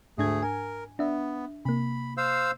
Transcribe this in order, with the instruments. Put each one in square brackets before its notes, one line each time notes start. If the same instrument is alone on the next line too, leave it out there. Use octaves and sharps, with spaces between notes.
[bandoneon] D2 A3 G#4 [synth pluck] G#2 D4 G#6
[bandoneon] A#4 [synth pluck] G#5
[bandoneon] B3 [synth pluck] D4 E5
[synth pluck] C3 A#3 [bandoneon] B5
[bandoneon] C5 F5 E6